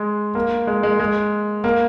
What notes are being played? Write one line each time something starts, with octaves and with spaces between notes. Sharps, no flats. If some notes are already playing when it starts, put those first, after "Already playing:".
Already playing: G#3
A#3
G#3
G#3
G#3
A#3